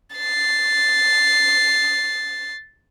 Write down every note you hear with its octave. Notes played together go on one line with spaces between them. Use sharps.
A6 C7